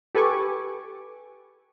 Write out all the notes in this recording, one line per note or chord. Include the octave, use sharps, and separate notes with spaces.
G4 A4 B4 G#5 C#6 D6